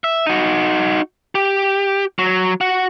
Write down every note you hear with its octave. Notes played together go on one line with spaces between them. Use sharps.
E5
D#4 F#4
G4
F#3
F#4